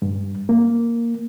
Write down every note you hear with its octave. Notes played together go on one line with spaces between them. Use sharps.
G2
A#3